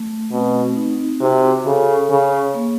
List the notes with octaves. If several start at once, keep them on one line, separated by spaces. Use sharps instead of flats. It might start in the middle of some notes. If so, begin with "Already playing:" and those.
Already playing: A3
B2 C4
D#4
C3 F#4
C#3 A4
C#3 C#5
A#3